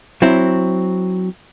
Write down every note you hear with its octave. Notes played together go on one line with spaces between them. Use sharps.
F#3 C4 E4